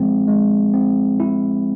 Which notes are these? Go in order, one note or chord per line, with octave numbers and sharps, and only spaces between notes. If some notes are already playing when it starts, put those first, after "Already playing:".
Already playing: F3 G#3 C4
G#3
C4
E4